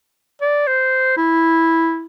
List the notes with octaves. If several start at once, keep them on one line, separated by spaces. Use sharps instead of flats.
D5
C5
E4